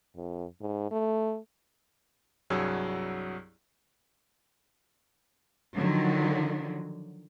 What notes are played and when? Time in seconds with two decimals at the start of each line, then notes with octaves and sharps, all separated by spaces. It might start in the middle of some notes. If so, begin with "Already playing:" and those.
0.16 F2
0.61 G#2
0.91 A3
2.50 C2 G2 F#3 G#4 C#5 E6
5.76 D3 D#3 F3 F#3